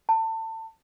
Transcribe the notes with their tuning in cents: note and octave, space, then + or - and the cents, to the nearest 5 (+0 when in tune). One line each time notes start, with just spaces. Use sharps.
A5 +30